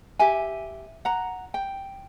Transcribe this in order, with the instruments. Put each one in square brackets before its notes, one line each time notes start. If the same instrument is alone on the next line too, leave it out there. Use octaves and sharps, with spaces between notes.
[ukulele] G4 E5 G#5
F#5 A#5
G5